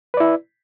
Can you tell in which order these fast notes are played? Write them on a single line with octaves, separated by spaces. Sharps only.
B4 D5 E4